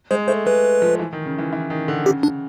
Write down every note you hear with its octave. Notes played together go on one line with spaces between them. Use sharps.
G#3 C5
A3 C5
G#3 B4
F3
E3
D#3
C#3
E3
E3
D#3
D3
C#3 G4
D4